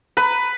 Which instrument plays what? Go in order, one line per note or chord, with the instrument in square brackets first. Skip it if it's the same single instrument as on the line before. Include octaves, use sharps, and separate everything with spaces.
[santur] B4